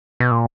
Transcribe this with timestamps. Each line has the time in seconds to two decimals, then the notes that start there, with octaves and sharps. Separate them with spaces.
0.20 B2
0.31 A#2